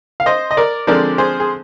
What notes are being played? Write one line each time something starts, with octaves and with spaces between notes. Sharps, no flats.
F5
C5 D#5
D#5
A#4 D5
D3 F3 G#3 C4 A#4 D5
G#4 C5
G#4